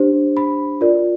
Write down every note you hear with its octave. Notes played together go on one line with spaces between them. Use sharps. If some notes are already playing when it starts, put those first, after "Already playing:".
Already playing: D4 G4 C5
B5
F4 A#4 D5